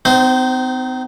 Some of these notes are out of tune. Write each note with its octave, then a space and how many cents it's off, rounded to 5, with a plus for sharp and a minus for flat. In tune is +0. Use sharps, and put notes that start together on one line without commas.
C4 -40 D#4 -5 C5 -5